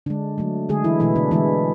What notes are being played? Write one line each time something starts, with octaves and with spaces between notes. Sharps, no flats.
D3 G#3 D4
D3 F#3 A3
D3 G#3 G#4
E3 E4
B2 E3 A3 E4
D3 D4
D3 E3 G#3 E4